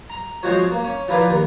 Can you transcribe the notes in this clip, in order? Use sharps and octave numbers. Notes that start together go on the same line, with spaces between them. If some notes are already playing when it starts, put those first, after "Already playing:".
A#5
F3 G#3 C4 F4 F#4 C#5
A#3
C#4
F3 E4 F4 A#4 B4 D5
D#2 A#4